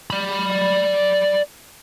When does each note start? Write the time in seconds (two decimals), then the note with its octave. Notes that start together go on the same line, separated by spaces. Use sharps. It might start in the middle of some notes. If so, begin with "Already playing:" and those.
0.10 D5 B5